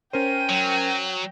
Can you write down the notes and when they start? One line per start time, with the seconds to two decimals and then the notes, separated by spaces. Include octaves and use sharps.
0.13 C#4 A#4 C5 G5 D#7
0.50 F#3